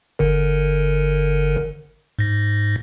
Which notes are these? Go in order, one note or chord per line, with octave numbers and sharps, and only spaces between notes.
G1 D3 A#4
G#2 A#6